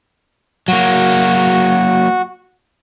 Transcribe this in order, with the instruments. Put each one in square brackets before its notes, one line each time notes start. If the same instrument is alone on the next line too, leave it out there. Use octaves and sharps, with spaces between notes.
[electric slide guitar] F#3 A#3 [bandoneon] F#4